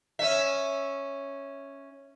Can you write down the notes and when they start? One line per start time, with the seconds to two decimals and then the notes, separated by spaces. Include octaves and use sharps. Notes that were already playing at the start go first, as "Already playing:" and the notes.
0.19 C#4 E5